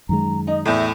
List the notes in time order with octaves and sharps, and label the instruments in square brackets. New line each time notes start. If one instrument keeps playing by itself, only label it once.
[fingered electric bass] F#2 D#3 G#3 [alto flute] A#5
[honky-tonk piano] D#4 [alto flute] D#5
[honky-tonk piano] E2 A2 [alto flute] E5